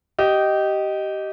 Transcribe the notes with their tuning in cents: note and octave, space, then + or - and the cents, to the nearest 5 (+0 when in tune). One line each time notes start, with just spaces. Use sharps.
G4 -20 D#5 +0